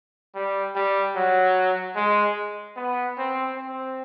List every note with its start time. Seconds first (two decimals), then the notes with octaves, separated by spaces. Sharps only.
0.35 G3
0.76 G3
1.16 F#3
1.96 G#3
2.77 B3
3.18 C4
3.58 C4